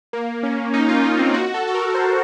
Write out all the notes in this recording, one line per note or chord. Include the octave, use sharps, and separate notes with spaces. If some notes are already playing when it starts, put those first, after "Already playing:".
A#3
C#4
D#4
F4
D#4
C4
F#4
A4
A4
A#4
C5